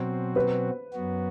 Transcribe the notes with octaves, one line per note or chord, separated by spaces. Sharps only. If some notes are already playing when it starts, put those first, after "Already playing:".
Already playing: B2 F#3 C4 F#4 C5
B4
F#2 F#3 B3 F#4